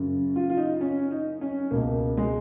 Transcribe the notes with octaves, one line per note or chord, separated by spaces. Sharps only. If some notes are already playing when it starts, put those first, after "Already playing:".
Already playing: F#2 C#3
F4
F4
D#4
C#4
D#4
C#4
C#2 B2 A#3
G#3